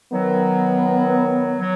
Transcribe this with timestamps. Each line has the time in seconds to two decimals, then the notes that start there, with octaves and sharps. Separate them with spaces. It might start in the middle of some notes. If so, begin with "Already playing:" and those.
0.12 D#3 F#3 B3
1.60 F#3